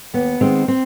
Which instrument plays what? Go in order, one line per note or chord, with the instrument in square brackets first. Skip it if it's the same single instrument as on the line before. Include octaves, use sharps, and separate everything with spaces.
[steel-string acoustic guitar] D#2 B3
D#3 G#3 B3 C4
C4